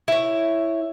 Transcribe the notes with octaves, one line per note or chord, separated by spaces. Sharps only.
E4 C#5